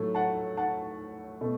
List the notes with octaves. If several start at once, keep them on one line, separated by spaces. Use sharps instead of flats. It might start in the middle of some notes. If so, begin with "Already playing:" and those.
Already playing: A2 F#3 A3
F#5 A5
F#5 A5
B2 A3